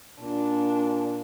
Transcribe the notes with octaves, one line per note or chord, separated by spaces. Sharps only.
A#2 D4